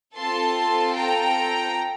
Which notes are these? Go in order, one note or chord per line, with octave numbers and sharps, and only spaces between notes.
C4 F4 A4 A5 C6
G5 A#5